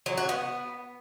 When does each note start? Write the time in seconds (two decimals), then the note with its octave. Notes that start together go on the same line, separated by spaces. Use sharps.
0.06 F#3
0.17 F#4
0.29 B3